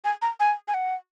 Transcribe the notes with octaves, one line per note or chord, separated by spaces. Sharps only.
G#5
A#5
G#5
G#5
F#5